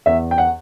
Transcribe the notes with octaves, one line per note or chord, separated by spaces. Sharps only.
E2 E5
G5
F#5